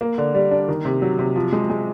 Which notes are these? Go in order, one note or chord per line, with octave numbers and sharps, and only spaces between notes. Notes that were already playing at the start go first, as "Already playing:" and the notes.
A#3
D3
G3
D4
D#3
C3
F#3
C3
F3
G#3
G#3